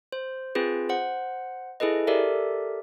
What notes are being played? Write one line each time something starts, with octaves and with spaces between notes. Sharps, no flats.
C5
C4 F4 G#4 B4
C5 F#5
E4 G#4 A4 B4 D#5
G4 A4 A#4 D5 E5